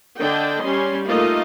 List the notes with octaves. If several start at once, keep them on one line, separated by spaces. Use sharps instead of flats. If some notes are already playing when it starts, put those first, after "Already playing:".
D3 D4 D#5 G5
G3 C#4 C6
A3 A#3 D#4 F4 D#5 F5